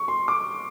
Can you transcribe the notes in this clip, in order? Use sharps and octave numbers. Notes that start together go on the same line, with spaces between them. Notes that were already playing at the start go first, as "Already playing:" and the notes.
Already playing: C#6
C6
D6